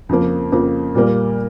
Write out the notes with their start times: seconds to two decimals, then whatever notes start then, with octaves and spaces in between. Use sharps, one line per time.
0.09 F2 C#3 F3 A#3
0.52 F2 C#3 F3 A#3
0.95 A#2 G3 A#3